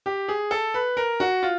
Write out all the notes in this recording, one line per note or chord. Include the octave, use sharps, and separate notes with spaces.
G4
G#4
A4
B4
A#4
F#4
F4